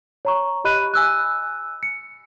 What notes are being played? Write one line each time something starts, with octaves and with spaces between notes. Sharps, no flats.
C#5 A#5 C#6
G4 D#5 B5 F#6 D#7
G#5 E6 F#6
C#7